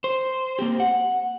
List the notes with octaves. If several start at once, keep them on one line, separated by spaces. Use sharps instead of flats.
C5
A#3 C4 G4
F#5